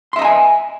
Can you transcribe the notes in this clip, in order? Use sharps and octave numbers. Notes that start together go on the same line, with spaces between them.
D#5 E5 G#5 A#5 C6